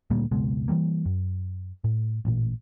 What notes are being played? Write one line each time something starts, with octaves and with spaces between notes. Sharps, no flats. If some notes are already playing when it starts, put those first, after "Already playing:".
D2 A#2 G3 A#3
F#1 C#2 B2 G#3
E3 F3 G3 A#3
F#2
A2
A1 A#2